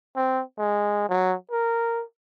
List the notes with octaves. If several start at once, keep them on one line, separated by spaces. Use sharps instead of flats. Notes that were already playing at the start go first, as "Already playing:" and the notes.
C4
G#3
F#3
A#4